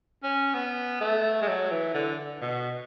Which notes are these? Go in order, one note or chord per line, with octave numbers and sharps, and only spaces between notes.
C#4
B3
A3
G#3
F#3
E3
D3
B2